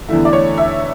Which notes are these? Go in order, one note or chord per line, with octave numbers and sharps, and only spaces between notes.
E2 D3 A3 E4
D5
C#5
E5